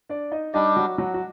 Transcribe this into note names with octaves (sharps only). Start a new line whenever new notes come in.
D4 D5
D#4 D#5
G3 D4 D#4 G4 D#5
F#3 F#4
F#3 F#4
F#4